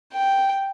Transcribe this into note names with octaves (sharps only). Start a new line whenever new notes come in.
G5